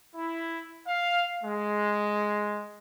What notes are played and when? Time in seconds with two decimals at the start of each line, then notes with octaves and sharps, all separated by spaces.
0.15 E4
0.87 F5
1.44 G#3